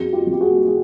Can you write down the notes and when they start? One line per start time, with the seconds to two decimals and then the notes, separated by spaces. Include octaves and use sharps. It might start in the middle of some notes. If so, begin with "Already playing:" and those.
Already playing: F2 F#4 G#4
0.13 F4 G4
0.26 F2
0.33 G4
0.40 F#4 G#4
0.68 F#4 G#4